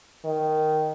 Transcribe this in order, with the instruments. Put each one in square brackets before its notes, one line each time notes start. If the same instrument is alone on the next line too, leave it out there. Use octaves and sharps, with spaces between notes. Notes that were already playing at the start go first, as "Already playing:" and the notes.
[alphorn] D#3